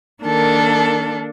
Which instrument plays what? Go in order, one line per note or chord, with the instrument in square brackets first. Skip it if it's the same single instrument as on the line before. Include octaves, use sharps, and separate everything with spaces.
[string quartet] D#3 A#3 D4 A4